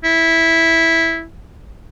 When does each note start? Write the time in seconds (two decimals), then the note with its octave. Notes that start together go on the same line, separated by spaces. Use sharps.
0.04 E4